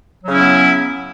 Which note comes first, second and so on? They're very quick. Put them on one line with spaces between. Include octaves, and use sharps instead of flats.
F#3 C#3 C#4 E4 B3